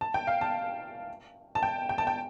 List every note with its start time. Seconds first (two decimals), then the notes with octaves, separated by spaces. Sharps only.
0.01 A5
0.14 G5
0.27 F5
0.41 A5
1.55 A5
1.63 G5
1.89 G5
1.98 A5
2.07 G5